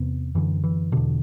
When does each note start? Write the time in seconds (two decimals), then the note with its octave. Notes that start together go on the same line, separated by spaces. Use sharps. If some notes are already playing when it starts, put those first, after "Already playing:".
Already playing: E2 C3 B3
0.35 F#2 D3 E3
0.64 E3
0.92 E2 B2 D3